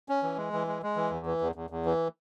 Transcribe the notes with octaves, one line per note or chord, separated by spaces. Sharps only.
C#4
E3
G#3
E3
G#3
G#3
E3
E2
E3
E2
E2
E2
E3